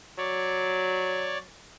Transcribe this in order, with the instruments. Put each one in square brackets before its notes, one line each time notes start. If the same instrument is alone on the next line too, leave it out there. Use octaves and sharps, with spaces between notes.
[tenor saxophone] F#3 [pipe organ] C#5 D5